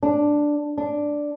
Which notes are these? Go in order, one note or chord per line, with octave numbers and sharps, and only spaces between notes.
D4
D4